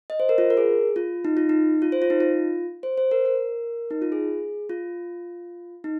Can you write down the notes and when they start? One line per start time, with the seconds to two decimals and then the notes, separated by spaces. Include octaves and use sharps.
0.10 D#5
0.20 C5
0.29 A#4
0.38 F4
0.50 A#4
0.57 G#4
0.96 F4
1.25 D#4
1.37 F4
1.49 D#4
1.82 F4
1.92 C5
2.02 F4
2.10 D#4
2.20 F4
2.83 C5
2.98 C5
3.11 A#4
3.25 A#4
3.91 D#4
4.02 F4
4.12 G#4
4.70 F4
5.84 D#4